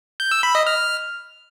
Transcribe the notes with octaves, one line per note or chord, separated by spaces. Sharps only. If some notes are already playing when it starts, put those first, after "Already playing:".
G6
E6
B5
D#5
F6